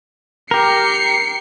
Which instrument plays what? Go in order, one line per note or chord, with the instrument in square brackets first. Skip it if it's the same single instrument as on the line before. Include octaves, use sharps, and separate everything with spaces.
[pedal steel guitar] G4 A#4 [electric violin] C7 C#7